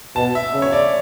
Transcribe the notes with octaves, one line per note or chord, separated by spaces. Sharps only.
B2 A5
E5
C#3
C#5
D5